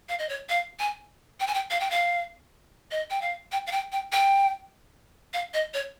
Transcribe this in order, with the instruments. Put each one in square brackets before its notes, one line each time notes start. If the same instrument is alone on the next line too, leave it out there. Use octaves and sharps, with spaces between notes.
[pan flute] F5
D#5
C#5
F5
G#5
G5
G#5
G5
F5
G5
F5
D#5
G5
F5
G5
F5
G5
G5
G5
F5
D#5
C#5